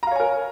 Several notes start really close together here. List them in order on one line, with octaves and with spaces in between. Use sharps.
A#5 F5 C#5 G#5 A#4